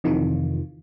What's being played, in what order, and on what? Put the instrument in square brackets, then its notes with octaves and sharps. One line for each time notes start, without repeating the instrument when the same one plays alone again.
[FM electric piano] F2 C3 D#3 E3 F4